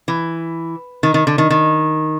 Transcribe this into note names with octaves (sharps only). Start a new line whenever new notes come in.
E3
D#3
D#3
D3
D#3
D#3